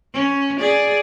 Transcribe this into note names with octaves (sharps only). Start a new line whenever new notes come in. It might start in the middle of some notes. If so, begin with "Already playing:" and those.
C#4
G#4 D5